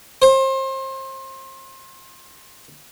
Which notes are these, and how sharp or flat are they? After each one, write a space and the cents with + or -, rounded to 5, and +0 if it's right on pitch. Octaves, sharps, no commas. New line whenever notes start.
C5 +30